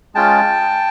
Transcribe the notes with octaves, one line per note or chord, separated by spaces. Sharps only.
G#3 C#4 F4 G5 A5